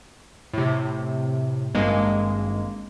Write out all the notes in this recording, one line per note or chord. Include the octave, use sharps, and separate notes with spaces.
A2 C3
G#1 G2 G#3 A#3